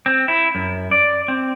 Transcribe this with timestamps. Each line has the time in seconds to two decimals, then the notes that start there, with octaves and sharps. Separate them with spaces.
0.06 C4
0.28 E4
0.55 F#2
0.91 D5
1.28 C4